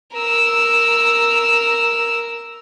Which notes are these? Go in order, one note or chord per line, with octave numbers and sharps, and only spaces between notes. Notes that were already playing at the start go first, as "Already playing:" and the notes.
A#4 E6